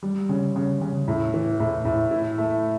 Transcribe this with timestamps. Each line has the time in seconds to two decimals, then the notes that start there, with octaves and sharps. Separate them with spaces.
0.03 G3
0.29 C#3
0.56 C#3
0.81 C#3
1.08 A2
1.34 E3
1.60 A2
1.85 A2
2.11 E4
2.38 A3